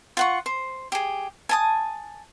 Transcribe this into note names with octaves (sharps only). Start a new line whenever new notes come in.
F4 F#5 C#6
C5
G4 G#4
G#5 A5 D#6